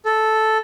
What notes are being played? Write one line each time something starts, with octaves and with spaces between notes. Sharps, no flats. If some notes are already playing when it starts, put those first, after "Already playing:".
A4